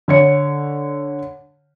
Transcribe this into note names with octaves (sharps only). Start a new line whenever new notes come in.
D3 C#5 C#7